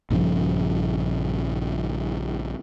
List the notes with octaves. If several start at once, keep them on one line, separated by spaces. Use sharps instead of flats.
A#1 G2 C#3 F3